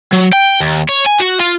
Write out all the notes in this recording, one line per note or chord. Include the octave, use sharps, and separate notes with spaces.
F#3
G5
D#2
C#5
G#5
F#4
F4